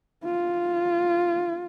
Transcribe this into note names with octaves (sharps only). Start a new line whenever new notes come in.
F4